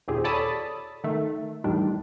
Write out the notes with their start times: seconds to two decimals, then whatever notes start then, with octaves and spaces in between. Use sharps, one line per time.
0.08 D#2 A#2 C4 G4 G#4
0.24 A4 C#5 D5 A5 B5 D#6
1.04 D#3 A3
1.64 E2 A2 D#3 G3 D4